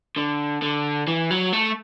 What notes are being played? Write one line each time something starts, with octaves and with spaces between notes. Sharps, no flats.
D3
D3
E3
F#3
A3